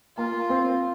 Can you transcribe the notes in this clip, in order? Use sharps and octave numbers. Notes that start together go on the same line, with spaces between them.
A#3 F4
C4